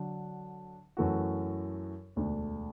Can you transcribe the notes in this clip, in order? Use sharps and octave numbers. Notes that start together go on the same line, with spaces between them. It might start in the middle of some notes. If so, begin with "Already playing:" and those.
Already playing: D3 F#3 D4
F#2 E3 A3 F#4
E1 D2 D3 A3 D4